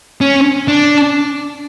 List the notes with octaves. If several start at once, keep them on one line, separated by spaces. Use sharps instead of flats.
C#4
D4